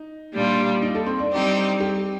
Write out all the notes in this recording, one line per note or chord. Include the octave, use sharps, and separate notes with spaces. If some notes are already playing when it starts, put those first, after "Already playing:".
Already playing: D#4
A#2 G3 D4 F4
D#4
A4
C4
D4
G3 C4 D#4 G4
G4